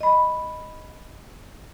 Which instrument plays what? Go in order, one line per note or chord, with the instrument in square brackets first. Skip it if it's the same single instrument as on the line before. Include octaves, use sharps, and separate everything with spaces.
[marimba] D#5 B5